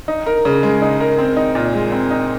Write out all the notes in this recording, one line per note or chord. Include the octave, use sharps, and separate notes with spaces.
D#4
A#4
C#3
G#3
D#4
A#4
C4
D#4
A#2
G#3
C4
D#4